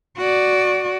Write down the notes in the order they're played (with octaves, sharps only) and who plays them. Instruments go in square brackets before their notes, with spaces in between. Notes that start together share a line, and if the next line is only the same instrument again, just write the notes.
[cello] F#4 D5